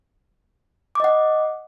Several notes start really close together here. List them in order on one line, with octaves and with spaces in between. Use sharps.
D6 D#5 F#5